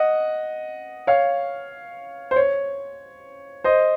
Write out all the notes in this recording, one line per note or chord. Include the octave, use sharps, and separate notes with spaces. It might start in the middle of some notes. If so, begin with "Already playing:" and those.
Already playing: D#5 F#5
C#5 F5
C5
C#5
C5 D#5